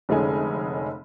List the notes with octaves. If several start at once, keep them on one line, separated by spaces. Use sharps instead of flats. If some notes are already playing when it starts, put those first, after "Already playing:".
F1 D3 G#3 C#4 D#4 G#5